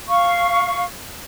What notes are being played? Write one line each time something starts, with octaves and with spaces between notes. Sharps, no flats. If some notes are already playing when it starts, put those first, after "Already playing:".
F5 C#6